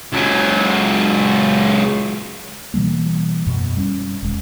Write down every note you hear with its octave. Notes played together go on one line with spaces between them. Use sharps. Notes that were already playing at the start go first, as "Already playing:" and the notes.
C#2 F#3
B2 E3 G3 A#3
F#2 B2
G3 B3 C#4
D#1 G#3